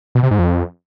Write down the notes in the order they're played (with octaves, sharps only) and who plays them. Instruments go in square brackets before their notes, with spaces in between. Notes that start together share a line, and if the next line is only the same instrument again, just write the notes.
[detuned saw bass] B2
C3
G#2
F2